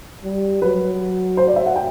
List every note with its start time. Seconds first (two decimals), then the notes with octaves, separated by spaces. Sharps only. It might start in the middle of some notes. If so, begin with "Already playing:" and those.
0.24 G3
0.62 F#3 B4
1.37 C5
1.47 D5
1.56 E5
1.66 F#5
1.76 G5